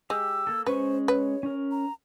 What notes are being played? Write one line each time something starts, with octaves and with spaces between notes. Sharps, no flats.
G#3 G4 E6
A#3 A4
G#3 C#4 B4 C5 C#6
B4 C#5
C#4 A#4
A#5